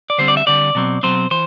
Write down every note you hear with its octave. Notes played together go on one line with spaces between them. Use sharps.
D5
D3 G3 C4 C5
D5
E5
D3 G3 C4 D5
B2 F#3 C4
B2 F#3 C4 C5
E3 C5